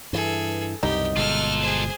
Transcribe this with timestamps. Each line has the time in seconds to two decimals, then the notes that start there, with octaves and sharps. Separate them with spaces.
0.13 G2 E3 G#4 A4
0.83 C2 F#2 B2 D#4 G4
1.16 G1 B2 G#3 F4 A4 F6
1.62 G#4 C5